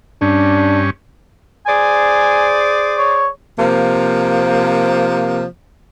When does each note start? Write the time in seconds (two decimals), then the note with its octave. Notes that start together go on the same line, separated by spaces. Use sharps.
0.22 G2 C#4 D4
1.66 G#4 C5 D5 G#5
2.98 C#5
3.59 C3 F3 A#3